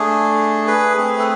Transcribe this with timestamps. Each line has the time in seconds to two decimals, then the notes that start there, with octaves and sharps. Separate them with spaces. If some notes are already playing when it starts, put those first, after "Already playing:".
Already playing: A3 D4 G#4
0.67 G#4 B4
0.97 A3 C4 G#4
1.19 A4